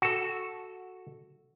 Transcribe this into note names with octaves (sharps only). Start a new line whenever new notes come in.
F#4 A4